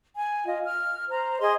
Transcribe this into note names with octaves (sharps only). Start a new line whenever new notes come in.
G#5
F4 D#5
F6
C5 A#5
G#4 D#5 C6